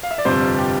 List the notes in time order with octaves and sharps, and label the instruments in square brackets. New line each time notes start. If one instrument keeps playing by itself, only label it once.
[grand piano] F5
E5
D5
G1 F2 C3 G3 C5
G4